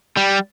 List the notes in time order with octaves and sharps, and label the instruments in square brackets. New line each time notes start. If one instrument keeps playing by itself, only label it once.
[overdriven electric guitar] G3